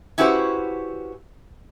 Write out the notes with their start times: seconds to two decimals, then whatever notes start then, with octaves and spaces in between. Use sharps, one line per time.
0.18 C#4 E4 F#4 G4 B4 C5